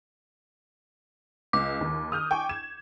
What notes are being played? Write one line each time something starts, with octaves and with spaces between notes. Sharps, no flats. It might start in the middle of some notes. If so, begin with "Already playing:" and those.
C#2 D6
D#2
D#6 F6 G6
G5 G#5 C#6
G#6 E7